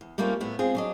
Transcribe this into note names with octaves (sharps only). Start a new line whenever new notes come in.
E2
G3 A3 A#3 C4 C#4 F4
A2 B3 E4
G#3 C4 F4 G#4
F#3 D4 D#5